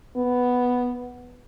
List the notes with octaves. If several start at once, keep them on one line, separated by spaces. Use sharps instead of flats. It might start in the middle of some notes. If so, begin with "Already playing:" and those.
B3